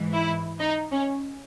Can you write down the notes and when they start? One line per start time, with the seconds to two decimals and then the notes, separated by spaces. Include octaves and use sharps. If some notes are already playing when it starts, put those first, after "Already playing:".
Already playing: G#2 E3
0.13 E4
0.60 D#4
0.91 C#4